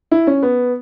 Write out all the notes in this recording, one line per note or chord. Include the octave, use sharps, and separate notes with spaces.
E4
C#4
B3